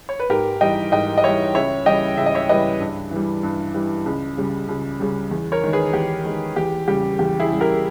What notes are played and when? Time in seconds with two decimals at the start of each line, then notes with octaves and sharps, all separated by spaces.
0.09 C#5
0.20 B4
0.29 G#2 G4 A#4
0.61 E3 G3 D#5 G5
0.92 G#2 D#5 G5
1.18 D#5
1.24 E3 G3 C#5 E5
1.55 C#2 C#5 E5
1.86 C#3 E3 G3 D#5 G5
2.18 C#2 E5
2.26 D#5
2.35 C#5 E5
2.49 C#3 E3 G3 B4 D#5
2.80 G2
3.11 E3 G3
3.43 G2
3.74 E3 G3
4.06 C#2
4.37 C#3 G3
4.69 C#2
5.00 C#3 G3
5.31 E2
5.52 A#4 C#5
5.62 D#3 G#3
5.73 G#4 B4
5.93 E2 G4
6.25 D#3 G#3
6.56 E2 G4
6.88 C#3 G3 G4
7.19 E2 G4
7.40 E4 G#4
7.51 C#3 G3
7.61 G4 A#4